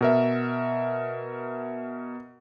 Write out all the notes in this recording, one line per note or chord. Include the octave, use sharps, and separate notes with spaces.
B2 A#4 E5